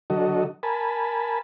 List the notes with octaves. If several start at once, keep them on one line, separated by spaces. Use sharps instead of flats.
D3 F#3 F#4 A4 D#5
A#4 G#5 A5 B5